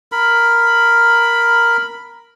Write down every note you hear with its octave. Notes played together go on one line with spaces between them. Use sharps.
A#4 B5